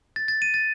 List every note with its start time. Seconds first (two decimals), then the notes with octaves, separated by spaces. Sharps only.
0.16 A6
0.28 A6
0.42 D#7
0.54 A6